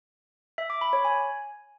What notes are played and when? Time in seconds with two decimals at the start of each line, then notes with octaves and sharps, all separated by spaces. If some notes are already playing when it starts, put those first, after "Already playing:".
0.58 E5
0.70 D6
0.81 B5
0.93 C#5
1.05 G#5